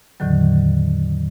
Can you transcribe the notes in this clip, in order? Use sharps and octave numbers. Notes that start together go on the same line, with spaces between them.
E2 A2 D3 D#3 F#3